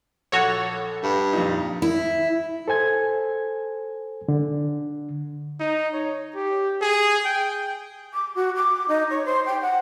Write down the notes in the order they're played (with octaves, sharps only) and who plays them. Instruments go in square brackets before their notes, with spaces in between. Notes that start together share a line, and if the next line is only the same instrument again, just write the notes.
[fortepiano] A#1 A4 [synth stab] F#4 C#5
[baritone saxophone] G2
[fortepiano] F2 A#2 D#4
[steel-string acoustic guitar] E4
[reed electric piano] A4 C5 G#5 G#6
D3
[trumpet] D#4
C#5
G4
G#4
G5
[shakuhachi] D6
F#4
D6
D#4
C#5
C5
G5
F#5